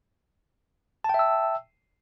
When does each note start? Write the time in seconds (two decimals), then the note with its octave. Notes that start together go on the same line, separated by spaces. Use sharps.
1.04 A5
1.09 G5
1.14 E5
1.19 E6